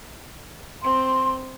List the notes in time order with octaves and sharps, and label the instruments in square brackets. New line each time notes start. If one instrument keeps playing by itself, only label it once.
[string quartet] C4 [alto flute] C6